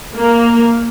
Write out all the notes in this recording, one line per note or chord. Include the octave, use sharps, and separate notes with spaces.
A#3